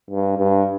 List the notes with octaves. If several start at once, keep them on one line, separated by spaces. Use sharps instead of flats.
G2
G2